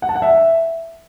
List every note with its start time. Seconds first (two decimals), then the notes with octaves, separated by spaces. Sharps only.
0.02 F#5
0.09 A5
0.16 F#5
0.22 E5